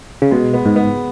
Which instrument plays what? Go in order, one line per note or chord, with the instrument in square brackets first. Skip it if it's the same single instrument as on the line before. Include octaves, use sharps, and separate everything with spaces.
[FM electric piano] C#3
[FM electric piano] B2 [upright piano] G#3
[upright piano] B3
[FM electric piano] G#2
[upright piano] B3